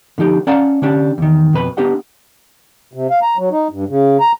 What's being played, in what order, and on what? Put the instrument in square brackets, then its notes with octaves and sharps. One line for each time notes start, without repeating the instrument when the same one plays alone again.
[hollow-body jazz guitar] D3 F3 D#4 G4
C#4 D5 F5 F#5 A5 A#5
D3 C#4 D4 G4
E2 D#3
F2 B2 B4 B5
B3 D4 G4 D#5 F#5
[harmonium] C3
F5
A#5
F#3
D#4
G2
C#3
A#5